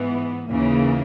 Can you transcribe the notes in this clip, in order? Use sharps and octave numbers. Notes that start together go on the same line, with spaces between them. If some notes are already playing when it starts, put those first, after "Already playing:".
Already playing: G#2 E3 B3
D#2 C#3 E3 A#3